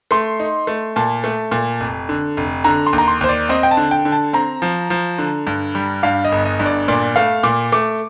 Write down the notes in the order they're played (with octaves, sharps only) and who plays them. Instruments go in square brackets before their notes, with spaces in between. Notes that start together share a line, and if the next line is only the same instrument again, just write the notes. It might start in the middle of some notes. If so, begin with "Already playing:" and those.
[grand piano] A3 C6
D#4
A3
A#2 A5
A3
A#2
F1
D3
F1
D3 A#5
C6
D#2
A#5
C6
D#2 C5
D5
C4 D#5
G5
A5
D3
G5
D3
A5
C4 A#5
F3
F3
D3
G2
G3
G2 F5
D#5
G1
D#5
G2
D5
A#2 D5
A3 F5
A#2 D6
A3 D6